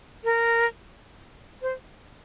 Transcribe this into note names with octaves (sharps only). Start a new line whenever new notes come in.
A#4
C5